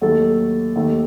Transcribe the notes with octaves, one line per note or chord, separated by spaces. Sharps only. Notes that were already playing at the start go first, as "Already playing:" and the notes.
D#2 D#3 F#3 A3 A4
D#2 D#3 A3